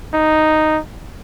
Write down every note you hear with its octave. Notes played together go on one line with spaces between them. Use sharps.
D#4